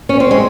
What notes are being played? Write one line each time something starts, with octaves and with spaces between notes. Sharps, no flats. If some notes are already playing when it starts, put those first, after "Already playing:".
C#4
C4
G#3